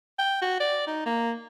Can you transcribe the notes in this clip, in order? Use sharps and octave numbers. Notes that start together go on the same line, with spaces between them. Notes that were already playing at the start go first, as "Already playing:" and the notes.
G5
F#4
D5
D#4
A#3